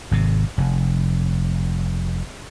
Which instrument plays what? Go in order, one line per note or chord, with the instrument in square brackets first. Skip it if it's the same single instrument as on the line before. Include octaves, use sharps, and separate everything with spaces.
[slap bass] G#1 C3
F1